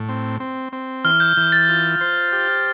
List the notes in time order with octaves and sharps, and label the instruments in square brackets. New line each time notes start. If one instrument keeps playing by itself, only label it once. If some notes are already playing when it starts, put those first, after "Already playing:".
Already playing: [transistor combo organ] A2
C4
C4
C4
[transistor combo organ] E3 [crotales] F6
[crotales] G6
[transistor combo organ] E3 [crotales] G6
[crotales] A6
[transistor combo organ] F4
C5
G4